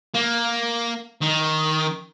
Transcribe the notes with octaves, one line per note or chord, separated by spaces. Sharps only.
A#3
D#3